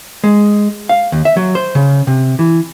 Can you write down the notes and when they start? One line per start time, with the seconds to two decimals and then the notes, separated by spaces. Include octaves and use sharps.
0.24 G#3
0.89 F5
1.12 D#2
1.25 E5
1.37 F#3
1.55 C5
1.75 C#3
2.07 C3
2.39 E3